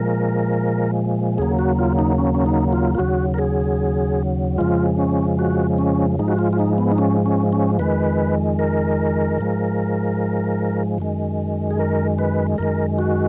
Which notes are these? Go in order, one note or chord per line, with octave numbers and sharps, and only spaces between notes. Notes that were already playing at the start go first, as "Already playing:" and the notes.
Already playing: A#2 F3 G#3 A#4
D#2 C#3 F#3 A#3 G#4
F#4
F4
D#4
C#4
C#4
D#4
F4
F4
D#2 C#3 F#3 F#4
A#4
G#4
F2 C#3 F3 G#3 F4
C#4
F#4
C#4
G#2 F3 G#3 D#4
F#4
F4
F4
D#4
B3
D#4
C#4
C#4
C#4
F2 D#3 G#3 B4
A#4
G#2 F3 G#3
F#2 D#3 G#3
G#4
A#4
B4
F#2 D#3 G#3 A#4
F#4